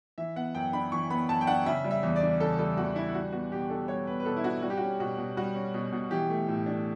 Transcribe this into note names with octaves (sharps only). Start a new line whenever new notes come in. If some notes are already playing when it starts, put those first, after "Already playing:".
E3 E5
B3 F#5
F#2 G5
D4 B5
E3 C#6
B3 B5
F#2 A5
G5
D4 F#5
C#3 E5
G3
E5
E2
D5
D4
C#3 A4
G3 A4
E2 F#4
D4 E4
G3 F#4
B3 F#4
B2 G4
D4 A4
G3 C#5
B3 B4
B4
B2 A4
E4
D4 F#4
G3 F#4
G4
C#4 F#4
B2 F#4
B2
G3 F#4
C#4
B2
B2
E3 G4
A3
A2
D4